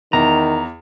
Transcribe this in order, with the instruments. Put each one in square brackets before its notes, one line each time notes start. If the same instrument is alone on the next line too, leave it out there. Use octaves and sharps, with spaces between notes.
[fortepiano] E2 [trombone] D#3 [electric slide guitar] A#5